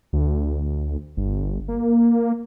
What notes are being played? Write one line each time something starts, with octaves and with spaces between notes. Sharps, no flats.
D2
G1
A#3